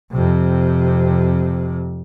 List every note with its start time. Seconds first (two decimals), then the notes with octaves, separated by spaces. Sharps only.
0.12 F2 C3